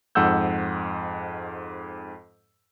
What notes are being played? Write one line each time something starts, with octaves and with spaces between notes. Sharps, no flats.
F2 G#2 F#5 E6 G6